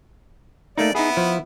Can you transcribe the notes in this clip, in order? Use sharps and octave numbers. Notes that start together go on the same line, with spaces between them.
A3 A#3 D#4 D5
B3 D#4 E4 G#4
F3